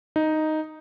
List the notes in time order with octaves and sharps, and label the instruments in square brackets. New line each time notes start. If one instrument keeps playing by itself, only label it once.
[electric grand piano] D#4